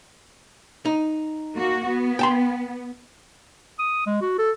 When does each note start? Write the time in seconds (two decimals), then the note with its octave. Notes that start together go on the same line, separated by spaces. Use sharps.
0.85 D#4
1.55 A#3 F#4
1.87 B3
2.19 G5 A5 C6
3.79 D#6
4.07 G#3
4.22 F#4
4.38 A4